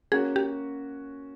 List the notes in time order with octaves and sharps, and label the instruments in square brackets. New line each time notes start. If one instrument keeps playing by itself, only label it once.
[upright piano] A#3 C#4 F#4 [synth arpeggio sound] G#4
[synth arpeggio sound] G4